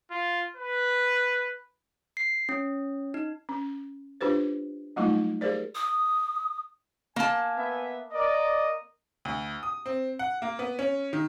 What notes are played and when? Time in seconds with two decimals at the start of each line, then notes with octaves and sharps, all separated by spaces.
0.11 F4
0.57 B4
2.17 C7
2.49 C#4
3.14 D#4
3.49 C#4
4.21 D4 F4 G4 B4 C5
4.96 F#3 G3 A3 A#3 D#4 F4
5.41 G4 G#4 A#4 C5 D5
5.75 D#6
7.16 A#3 G#5 A5
7.55 B3 B4 E5
8.13 A#4 D5 D#5
9.25 D2
9.63 D#6
9.86 C4
10.19 F#5
10.42 A#3
10.59 B3
10.79 C#4
11.13 D#3